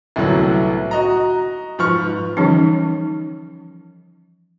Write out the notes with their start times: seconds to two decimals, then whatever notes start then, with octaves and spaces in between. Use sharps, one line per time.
0.16 C2 A2 D3 F#3 B3
0.91 F#4 D#5 A#5
1.78 G#2 F3 B4 C#6 F6
2.37 D3 E3 F3 G3 C#4 D#4